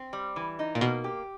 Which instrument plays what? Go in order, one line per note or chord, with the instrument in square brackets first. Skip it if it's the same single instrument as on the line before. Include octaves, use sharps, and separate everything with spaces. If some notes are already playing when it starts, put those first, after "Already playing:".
Already playing: [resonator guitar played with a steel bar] C4
G3
E3
D#4
[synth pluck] A#2
[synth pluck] B2 [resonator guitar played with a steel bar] A#3
[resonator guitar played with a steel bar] G4